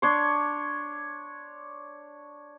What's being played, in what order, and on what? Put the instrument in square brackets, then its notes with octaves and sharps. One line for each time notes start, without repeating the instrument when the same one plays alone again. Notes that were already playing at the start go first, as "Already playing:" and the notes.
[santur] D4 C#5 C6